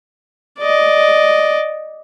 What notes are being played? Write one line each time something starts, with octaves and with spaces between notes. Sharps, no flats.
D5 D#5